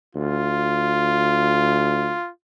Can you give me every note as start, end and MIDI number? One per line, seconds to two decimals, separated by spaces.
0.15 2.14 38
0.15 2.30 65